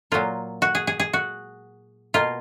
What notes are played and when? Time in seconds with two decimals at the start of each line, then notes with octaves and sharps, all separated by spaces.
0.12 A#2 F#3 A#3 F4
0.62 F#4
0.75 G#4
0.87 G#4
1.00 G#4
1.13 F#4
2.14 B2 A#3 F4